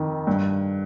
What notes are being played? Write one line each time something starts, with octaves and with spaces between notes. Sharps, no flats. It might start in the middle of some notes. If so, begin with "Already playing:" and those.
Already playing: F2 D#3
G2